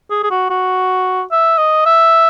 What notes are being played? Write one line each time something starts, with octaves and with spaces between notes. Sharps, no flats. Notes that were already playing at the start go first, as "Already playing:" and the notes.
G#4
G#4
F#4
F#4
E5
D#5
E5